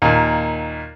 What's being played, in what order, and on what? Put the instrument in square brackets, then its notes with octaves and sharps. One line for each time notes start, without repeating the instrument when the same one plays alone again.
[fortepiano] D#2 A#2